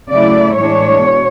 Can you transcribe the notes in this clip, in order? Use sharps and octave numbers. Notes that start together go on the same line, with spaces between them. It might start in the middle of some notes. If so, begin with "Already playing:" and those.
C#3 F#3 A3 E4 D5
A2 E3 G#3 D4 C#5
B2